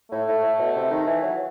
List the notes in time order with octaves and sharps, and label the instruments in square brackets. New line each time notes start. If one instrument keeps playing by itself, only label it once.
[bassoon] A2 [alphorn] A3
[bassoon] A2
A2
B2
C3
D#3
E3
F#3